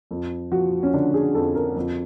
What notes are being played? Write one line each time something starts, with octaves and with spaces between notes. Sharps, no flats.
F2
F3 F#4
C#4
D3 D4
G#4
F2 A4
A#4
F2